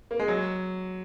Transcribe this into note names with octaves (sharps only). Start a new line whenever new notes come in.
A#3
G#3
F#3